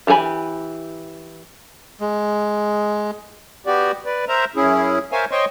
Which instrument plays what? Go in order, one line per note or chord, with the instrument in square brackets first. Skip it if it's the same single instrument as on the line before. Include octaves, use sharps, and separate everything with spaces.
[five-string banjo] E3 G4 G#4 G#5 B5
[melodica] G#3
[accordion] B3 F#4 G4 D5
B4 D5
A#4 C5 E5 A#5
F#2 C#4 E4 G#4
A#4 C5 C#5 E5 F5 G#5
C5 C#5 D#5 G5 C6 C#6